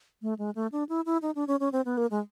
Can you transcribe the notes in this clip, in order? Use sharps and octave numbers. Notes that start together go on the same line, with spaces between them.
A3
G#3
A3
D4
E4
E4
D#4
D4
C#4
C#4
C4
B3
A#3
G#3